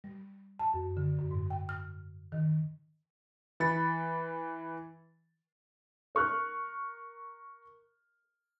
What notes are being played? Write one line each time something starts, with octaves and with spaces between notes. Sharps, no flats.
G3
A5
F#2
D3
F#2
G#2
G5
F6
D#3
E3 B5 A6 C#7
A#4 C#6 F6 F#6